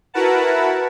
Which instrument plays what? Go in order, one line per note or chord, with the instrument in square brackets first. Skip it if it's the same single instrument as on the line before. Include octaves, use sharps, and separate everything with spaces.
[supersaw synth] E4 F#4 A#4 B4 F#5 A5